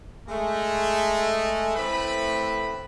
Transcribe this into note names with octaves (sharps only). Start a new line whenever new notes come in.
G#3 A3
A2 A3 C4 B4 B5